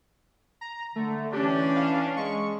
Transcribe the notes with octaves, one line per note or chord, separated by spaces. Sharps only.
A#5
D3 A3
E3 C#4 D4 G4
F5
G#3 C#6